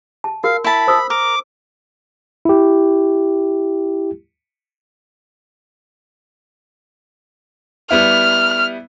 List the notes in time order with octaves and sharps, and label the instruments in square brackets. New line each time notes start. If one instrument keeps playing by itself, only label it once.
[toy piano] A5
[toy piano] F#4 A#4 [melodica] F5
[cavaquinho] E4 A5 [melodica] B5
[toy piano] C5 D#6 E6
[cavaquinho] A#4 [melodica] D6
[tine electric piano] E4 G4
[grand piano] G3 B3 E4 [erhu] F6